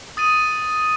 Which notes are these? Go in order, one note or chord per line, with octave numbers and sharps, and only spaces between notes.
D#6 A6 D#7